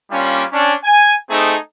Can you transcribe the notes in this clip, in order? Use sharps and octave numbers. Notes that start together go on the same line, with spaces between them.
G3 A#3 C#4 D4 F4
C#4 D4
G#5
A3 C4 D#4 G#4 A4